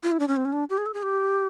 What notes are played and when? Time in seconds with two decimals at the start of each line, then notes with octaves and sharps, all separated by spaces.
0.03 F4
0.12 E4
0.20 D4
0.28 C#4
0.37 C4
0.45 C#4
0.53 D4
0.70 G4
0.78 G#4
0.86 A4
0.94 G#4
1.03 G4